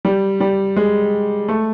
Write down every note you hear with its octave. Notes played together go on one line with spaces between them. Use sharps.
G3
G3
G#3
A3